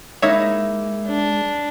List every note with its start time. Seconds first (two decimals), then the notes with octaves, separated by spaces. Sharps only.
0.22 G#3 A#3 D#4 E4 C#5 E5
1.07 D4